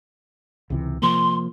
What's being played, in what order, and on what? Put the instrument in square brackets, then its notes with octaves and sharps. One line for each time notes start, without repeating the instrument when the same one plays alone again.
[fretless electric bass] C#2 C3 E3
[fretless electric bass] C3 F3 A#3 [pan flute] C6